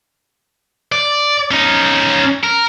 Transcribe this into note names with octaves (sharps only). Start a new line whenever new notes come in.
D5
C#4 D#4
A#4